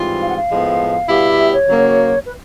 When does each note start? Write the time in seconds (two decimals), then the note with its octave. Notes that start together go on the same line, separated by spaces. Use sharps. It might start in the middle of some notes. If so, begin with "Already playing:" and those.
Already playing: G#2 E3 G3 C4 F4
0.21 F5
0.28 F#5
0.36 F5
0.50 A2 F3 G#3 B3
1.08 B2 G3 B3 E4 G4
1.38 E5
1.52 C#5
1.67 C#3 F#3 A#3
2.25 B4